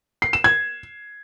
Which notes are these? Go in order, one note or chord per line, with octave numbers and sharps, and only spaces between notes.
C7
E7
G#6